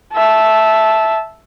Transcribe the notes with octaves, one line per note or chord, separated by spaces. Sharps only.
E5 A5